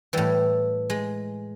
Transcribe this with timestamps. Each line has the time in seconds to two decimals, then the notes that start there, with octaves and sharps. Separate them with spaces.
0.13 A2 E3 G3
0.90 G#3